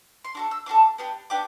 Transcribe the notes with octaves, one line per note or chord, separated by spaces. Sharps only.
C6
D4 F#4 A4 D6
E6
D4 F#4 A4 D6
B3 D4 G4
B3 D4 G4 D6